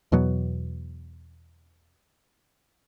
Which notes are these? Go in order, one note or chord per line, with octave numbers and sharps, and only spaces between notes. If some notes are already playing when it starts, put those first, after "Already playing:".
E2 B2 F#3 B3